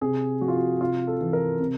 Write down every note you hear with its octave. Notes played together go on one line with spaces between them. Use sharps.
C3 G#4
F3 F#4
F4
F#4
C3 F4
A4
E3
A#4
C3